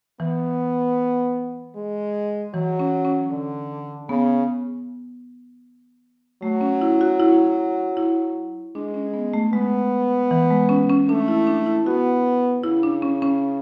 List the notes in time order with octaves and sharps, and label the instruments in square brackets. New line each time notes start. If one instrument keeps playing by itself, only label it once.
[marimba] E3 [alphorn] B3
[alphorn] G#3
[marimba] E3 [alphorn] F#3
[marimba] C#4
C#4
[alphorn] D3
[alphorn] C#3 [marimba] B3
[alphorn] F#3 [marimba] A3
[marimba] C#4
E4
F#4
E4
E4
[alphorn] G#3 [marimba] D4
[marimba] C#4
B3
A3
[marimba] G#3 [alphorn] B3
[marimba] E3
G#3
C#4
C#4
[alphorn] A3 [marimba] D4
[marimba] E4
D4
E4
[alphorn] B3 [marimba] F#4
[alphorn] C#3 [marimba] E4
[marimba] D4
C#4
C#4